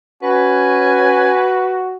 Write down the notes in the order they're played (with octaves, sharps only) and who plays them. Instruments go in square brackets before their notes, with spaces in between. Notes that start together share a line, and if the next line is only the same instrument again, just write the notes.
[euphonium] C#4 [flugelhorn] F#4 [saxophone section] B4 [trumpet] G#5